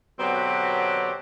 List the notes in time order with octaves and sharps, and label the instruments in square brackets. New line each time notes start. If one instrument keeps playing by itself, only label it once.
[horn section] B2 D3 F#3 B3 C4 G4